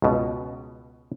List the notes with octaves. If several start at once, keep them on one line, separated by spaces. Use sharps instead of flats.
C#2 B2